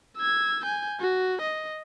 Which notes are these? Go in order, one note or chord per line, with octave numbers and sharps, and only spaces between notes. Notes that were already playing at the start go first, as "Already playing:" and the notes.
E6 G#6
G#5 G6
F#4
D#5